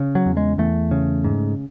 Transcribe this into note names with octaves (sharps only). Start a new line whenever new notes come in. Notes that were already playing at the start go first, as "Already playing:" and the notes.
Already playing: C#3
F#3
E2
G#3
E2 A3
C#3
G#2